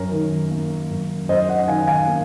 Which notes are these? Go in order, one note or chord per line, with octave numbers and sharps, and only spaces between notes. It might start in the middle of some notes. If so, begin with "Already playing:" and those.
Already playing: F#2 A#4 C#5
D#3
A#3
F#2
F#2 C5 D#5
D#5 F#5
D#3 F5 G#5
F5 G#5
A#3